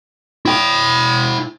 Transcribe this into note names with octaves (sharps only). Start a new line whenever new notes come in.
E4 G5